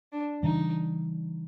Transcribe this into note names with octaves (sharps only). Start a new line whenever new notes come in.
D4
C#3 E3 G3 D#4